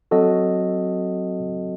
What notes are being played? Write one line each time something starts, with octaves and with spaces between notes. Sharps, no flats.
F#3 C4 F#4 A4 D#5